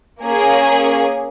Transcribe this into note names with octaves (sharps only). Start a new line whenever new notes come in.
A#3 C#4 G#4